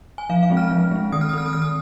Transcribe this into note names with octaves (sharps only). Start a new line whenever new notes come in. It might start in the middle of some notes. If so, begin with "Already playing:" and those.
G#5
F3 F5
F5
G#3 C4
F6
F3
G#3 C4
D#3 D#6
F6
D#6
C4 F6
D#6
D#3 F6
D#6